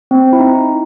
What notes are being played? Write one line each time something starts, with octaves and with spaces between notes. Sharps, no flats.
C4
E4
D#4